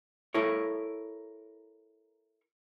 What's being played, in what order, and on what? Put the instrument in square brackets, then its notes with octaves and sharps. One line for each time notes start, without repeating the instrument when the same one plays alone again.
[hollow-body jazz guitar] E4 A4 A#4 C#5